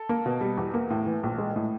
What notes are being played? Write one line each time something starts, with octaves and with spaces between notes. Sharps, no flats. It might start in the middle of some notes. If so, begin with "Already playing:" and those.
Already playing: A4
A#3
B2
G3
E2
A#3
A2
E3
A#1
G#3
A2